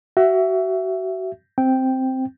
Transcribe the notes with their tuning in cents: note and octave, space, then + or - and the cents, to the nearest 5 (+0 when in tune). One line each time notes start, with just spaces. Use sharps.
F#4 +30 E5 +15
C4 +0 G5 +0